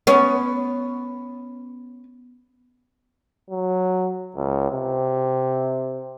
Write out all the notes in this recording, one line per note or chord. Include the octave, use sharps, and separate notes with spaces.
B3 C#4
F#3
C#2
C3